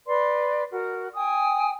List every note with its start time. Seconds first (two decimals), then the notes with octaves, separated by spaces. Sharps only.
0.06 B4 D5 C6
0.71 F#4 A#4
1.14 G5 G#5 D#6